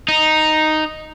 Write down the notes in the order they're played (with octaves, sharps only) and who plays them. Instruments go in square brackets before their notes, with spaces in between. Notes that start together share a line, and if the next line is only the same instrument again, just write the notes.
[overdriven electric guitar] D#4